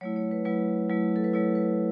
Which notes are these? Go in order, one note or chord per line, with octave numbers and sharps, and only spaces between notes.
F#3 A3 E4 C#5
C#5
B4
F#3 A3 E4 B4
F#3 A3 E4
A4
B4
F#3 A3 E4 C#5
B4